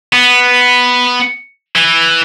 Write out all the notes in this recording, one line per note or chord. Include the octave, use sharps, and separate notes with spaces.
B3
E3